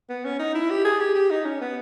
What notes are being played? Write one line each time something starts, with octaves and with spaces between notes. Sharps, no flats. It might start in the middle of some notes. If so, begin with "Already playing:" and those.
B3
C#4
D#4
E4
G4
G#4
G4
G4
D#4
C#4
B3